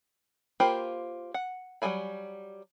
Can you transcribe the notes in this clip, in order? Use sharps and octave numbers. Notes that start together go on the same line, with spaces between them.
A#3 F4 G4 C5 B5
F#5
F#3 G3 F4 G#5 B5